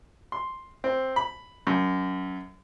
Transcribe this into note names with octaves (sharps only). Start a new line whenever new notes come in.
C6
C4
B5
F#2